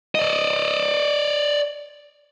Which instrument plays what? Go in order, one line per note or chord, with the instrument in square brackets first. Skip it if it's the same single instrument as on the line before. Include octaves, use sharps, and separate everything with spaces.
[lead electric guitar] D5 D#5